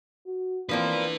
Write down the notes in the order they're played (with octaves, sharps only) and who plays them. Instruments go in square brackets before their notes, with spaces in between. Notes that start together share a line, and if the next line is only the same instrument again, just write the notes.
[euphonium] F#4
[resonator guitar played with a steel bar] F3 A#3 C4 [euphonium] D4 [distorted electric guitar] E4 B4